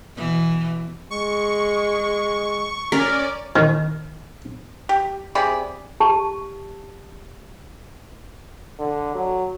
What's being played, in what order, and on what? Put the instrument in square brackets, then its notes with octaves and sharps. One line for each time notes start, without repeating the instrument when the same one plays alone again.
[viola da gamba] B2 E3
[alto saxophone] G#3 [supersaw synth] C#6
[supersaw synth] C#4 D5 [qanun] A#4
[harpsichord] D#3
[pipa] G4
C3 G#4 D5 B5
[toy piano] G4 A5
[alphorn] D3
F#3